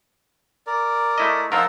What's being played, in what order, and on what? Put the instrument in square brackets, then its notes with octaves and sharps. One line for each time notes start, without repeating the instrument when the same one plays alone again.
[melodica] A#4 D5
[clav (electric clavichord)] A3 E4 D#5
[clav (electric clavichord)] F3 F4 A#4 [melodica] D#4 F#5 E6